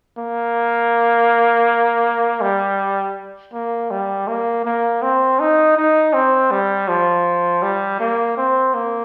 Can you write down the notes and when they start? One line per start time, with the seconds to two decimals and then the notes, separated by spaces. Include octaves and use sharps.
0.18 A#3
2.41 G3
3.53 A#3
3.90 G3
4.27 A#3
4.65 A#3
5.02 C4
5.40 D#4
5.77 D#4
6.13 C4
6.51 G3
6.88 F3
7.62 G3
8.00 A#3
8.37 C4
8.74 A#3